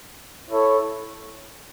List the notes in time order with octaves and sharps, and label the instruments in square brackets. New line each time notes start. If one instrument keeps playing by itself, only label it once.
[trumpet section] E4 A4 C#5